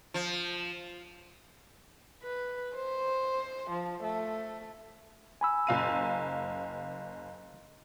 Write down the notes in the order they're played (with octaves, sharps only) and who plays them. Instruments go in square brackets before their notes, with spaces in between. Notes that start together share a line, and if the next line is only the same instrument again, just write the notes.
[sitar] F3
[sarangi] B4
C5
F3
A3
[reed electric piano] G#5 B5 E6
[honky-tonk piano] F#1 F5 D#7